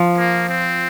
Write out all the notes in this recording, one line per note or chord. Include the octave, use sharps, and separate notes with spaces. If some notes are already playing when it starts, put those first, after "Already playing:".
Already playing: F3
A#3
C4